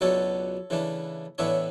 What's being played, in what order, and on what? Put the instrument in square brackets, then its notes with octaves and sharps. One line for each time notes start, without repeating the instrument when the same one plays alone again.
[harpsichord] C#2 B2 F#3 A3 D4 A4 C#5
C#3 E3 A3 D4
A2 E3 B3 D4 C#5 E5